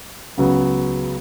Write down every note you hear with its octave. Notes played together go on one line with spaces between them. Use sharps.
C#2 C#3 F#3 B3